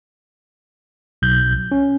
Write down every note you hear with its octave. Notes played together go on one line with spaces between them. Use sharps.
B1 G6
C#4